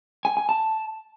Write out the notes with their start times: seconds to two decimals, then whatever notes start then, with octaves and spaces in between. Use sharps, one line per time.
0.25 G#5
0.37 G#5
0.49 A5